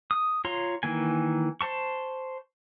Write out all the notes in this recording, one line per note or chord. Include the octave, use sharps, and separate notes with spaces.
D#6
F4 C#5 A#5 C6
D#3 E3 A#3 G#5
C5 A5 C#6